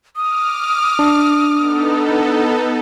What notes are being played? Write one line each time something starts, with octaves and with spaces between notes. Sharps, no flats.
D6 D#6 F6
D4
B3 D#4 A4